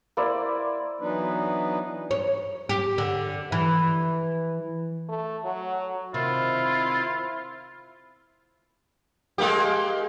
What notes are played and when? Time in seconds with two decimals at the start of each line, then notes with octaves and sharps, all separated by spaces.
0.17 A#3 E4 C5 D5
1.01 E3 F#3 B3 D4 D#4 B4
2.11 C#5
2.69 G4
2.98 D3
3.52 E3
5.09 A3
5.44 F#3
6.14 C3 D#3 E4 F4
9.38 G#3 A#3 G4